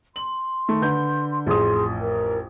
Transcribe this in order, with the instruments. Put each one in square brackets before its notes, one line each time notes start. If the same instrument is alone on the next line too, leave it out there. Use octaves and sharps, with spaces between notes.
[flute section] C6 [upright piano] F#7
[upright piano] D#3 A3
D3 B4 G6
[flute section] C6
[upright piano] A1 F2 D#6 [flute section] G#4 C6
[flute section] A#4